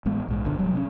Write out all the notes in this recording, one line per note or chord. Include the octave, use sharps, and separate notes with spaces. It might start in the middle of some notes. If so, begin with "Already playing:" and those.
A1 G#3 B3
A#1 G#2
G1 B2 D3
D#1 F#3 G3
C3 A3 C#4